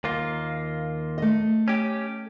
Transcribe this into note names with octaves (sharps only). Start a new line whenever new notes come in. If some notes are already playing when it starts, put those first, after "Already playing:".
D#2 A#3 F4
A3 D#5
C#4 G4